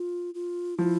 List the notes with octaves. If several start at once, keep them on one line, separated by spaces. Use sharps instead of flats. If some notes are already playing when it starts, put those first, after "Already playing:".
Already playing: F4
F4
F3 E4